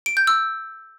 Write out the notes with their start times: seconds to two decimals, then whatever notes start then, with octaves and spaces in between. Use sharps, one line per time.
0.06 D7
0.17 G6
0.27 E6